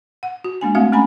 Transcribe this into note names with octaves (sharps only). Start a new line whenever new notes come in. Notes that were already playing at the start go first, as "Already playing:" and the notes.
F#5
F#4
G#3 A#3 D4 G#5
A3 C4 F#4 E5 F5
A3 C#4 G#5 A#5 B5